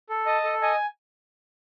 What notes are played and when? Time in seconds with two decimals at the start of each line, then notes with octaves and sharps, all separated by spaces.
0.10 A4
0.26 D#5 A5
0.44 A4
0.62 D#5 G#5